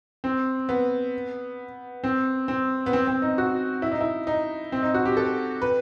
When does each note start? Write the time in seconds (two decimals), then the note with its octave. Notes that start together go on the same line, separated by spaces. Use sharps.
0.24 C4
0.69 B3
2.04 C4
2.48 C4
2.86 B3
2.93 C4
3.07 C4
3.22 D#4
3.38 F#4
3.82 E4
3.92 D#4
4.01 E4
4.27 D#4
4.72 C4
4.83 D#4
4.94 F#4
5.05 G4
5.17 A4
5.62 B4